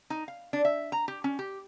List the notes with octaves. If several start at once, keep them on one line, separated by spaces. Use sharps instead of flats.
D#4
F5
D4
E5
A#5
G4
C#4
G4